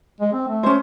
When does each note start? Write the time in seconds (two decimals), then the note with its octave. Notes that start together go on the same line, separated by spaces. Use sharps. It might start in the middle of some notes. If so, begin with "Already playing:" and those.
0.21 G#3
0.33 C4
0.48 A3
0.63 C#4 C5